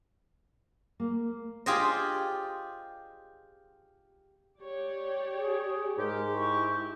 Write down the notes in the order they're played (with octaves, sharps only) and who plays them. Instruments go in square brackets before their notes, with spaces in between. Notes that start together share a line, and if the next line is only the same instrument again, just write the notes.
[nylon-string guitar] A#3
[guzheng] F4 G4 G#4 C5 D5 D#5
[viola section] G4 C#5 D5
[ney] G#4
[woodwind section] G#2 G4 [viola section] G#3 [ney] A#4
[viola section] E4 [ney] C#6